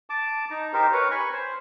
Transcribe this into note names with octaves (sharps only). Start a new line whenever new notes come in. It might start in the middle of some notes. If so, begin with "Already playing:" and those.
A5 D6
D#4 A#5
D#4 G4 A#4 C5
A#4 B4 C#5 A#5
G#5 B5 C#6
C5